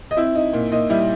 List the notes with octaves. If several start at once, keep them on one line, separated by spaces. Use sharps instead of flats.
D#5
C4 E4 E5
D#4
A#2
A#2 D#4 D#5
G3 E4 E5